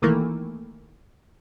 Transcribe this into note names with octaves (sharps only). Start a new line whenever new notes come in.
B1 D#3 E3 A3 A#3